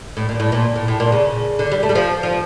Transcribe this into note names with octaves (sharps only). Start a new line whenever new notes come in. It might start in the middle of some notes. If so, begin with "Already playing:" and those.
A2
A#2
A2
A#2
A2
A2
A#2
C#3
D3
G3
A3
G3
F3
F3